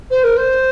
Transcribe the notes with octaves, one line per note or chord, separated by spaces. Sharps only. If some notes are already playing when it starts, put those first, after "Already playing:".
C5
A#4
C5